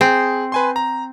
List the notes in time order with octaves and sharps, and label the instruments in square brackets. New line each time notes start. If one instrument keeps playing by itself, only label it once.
[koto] C4 [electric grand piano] G#4
[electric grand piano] B4 G#5 C6
A#5